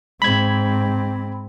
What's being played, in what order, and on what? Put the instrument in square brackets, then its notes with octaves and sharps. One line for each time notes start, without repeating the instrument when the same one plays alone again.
[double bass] G#2 C4 [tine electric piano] B5 G#6